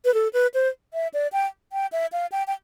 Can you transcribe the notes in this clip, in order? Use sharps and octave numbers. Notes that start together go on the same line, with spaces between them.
B4
A4
B4
C5
E5
D5
G5
G5
E5
F5
G5
G5